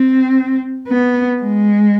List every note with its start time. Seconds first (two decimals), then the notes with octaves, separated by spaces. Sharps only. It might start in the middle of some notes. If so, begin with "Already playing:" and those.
Already playing: C4
0.88 B3
1.42 G#3